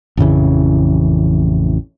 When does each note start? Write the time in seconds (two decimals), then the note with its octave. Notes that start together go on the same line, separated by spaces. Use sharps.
0.17 A1 F2 C#3 E3